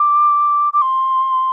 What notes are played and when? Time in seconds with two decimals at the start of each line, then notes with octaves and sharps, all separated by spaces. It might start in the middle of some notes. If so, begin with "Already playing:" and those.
Already playing: D6
0.73 D6
0.81 C6